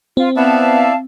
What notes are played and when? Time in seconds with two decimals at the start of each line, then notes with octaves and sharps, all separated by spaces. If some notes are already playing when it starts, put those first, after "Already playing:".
0.17 C4 F4
0.36 B3 E4 D5 E5 F5 A5